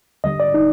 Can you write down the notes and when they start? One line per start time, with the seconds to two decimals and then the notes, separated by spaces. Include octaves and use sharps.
0.24 D#2 D3 G3 D#5
0.40 D5
0.54 D#4